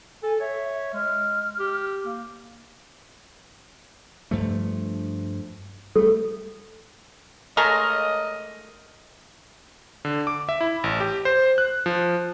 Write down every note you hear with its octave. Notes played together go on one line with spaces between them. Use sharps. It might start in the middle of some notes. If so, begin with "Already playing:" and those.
A4 G#5
C#5 E5
E5
G#3 F6
G4
A#3
G2 F3 A3
G3 A3 A4
G#3 A3 A#4 D#5
D3
D6
E5
E4
A1
G4
C5
F#6
F3